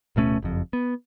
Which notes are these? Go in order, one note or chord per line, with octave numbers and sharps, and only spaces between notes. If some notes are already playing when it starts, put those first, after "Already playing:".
D1 B2 A3 C#4
F#1 F2
B3